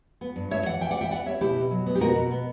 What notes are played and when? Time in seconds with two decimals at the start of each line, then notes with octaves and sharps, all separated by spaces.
0.21 B3
0.36 G2
0.51 G2 C#5 E5
0.66 E3 D5 F#5
0.80 E3 E5 G5
0.91 D5 F#5
0.95 E3
1.01 E5 G5
1.10 B3 D5 F#5
1.26 G3 C#5 E5
1.41 B2 E4 G4
1.56 B2
1.71 F#3
1.86 B3
1.95 G4
2.00 B2 F#4 A#4
2.15 B2
2.31 B3